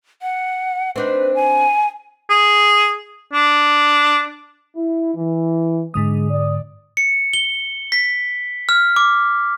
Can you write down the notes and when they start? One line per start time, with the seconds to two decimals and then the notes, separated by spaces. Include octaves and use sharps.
0.22 F#5
0.96 C4 D4 D#4 B4
1.35 G#5
2.30 G#4
3.33 D4
4.76 E4
5.16 E3
5.94 G#2 D3 G#3 D#6
6.30 D5
6.97 C#7
7.33 G7
7.92 B6
8.69 F6
8.96 D6